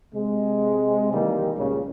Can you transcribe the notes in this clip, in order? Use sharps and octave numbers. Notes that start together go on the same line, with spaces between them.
C3 G#3
D#3 E3 G3 A#3 D#4
C#2 A#2 C#3